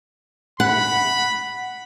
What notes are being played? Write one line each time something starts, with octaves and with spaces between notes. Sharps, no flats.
F#5 B5